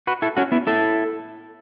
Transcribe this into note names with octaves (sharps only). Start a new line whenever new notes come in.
F#4 B4
E4 A4
C#4 F#4
B3 E4
E4 A4